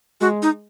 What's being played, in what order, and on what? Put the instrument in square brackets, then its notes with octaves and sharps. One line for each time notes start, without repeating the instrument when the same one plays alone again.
[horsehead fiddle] G#3 [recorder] F#4
[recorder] D#4